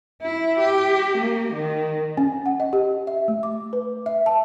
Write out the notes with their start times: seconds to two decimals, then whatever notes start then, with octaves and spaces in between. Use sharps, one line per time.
0.21 E4
0.59 G4
1.18 A#3
1.53 D#3
2.17 C#4
2.46 F#5
2.60 D#5
2.73 G4
3.07 E5
3.28 A3
3.43 D6
3.73 B4
4.06 E5
4.26 A5